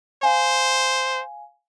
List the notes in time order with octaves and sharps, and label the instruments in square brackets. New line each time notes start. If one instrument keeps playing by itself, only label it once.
[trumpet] C5 [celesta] F5 G#5